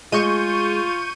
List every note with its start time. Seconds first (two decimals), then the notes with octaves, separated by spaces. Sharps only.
0.12 G#3 F4 C#6 G6 D#7